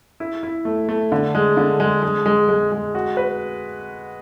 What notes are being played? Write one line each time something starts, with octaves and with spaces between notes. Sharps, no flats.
E4
E4
A3
A3
D3
G#3
D3
G#3
G#3
G#3
G#3
G#3
F#4
B4